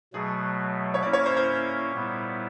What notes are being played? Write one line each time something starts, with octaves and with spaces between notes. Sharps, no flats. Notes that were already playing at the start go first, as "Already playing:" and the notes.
B2 F#3 A3 G#4
C#5
A#3 C#4 E4 D5
C#5
C5
C5
A#2 G3 B3 E4